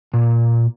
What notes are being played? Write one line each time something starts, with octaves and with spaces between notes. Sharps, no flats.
A#2